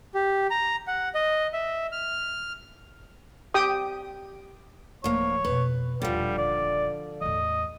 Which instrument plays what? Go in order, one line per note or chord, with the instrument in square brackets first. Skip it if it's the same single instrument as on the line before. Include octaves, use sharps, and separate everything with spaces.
[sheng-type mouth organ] G4
A#5
F#5
D#5
E5
F6
[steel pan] G4 G5 D#6
[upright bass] D1 F3 [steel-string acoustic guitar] D2 A#3 [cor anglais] C#5
[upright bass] F2 B2 [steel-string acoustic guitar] B4
[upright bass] D#1 G#1 [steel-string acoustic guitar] D3 F3 [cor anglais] G3
[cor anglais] D5
[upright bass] E2 A2 [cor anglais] D#5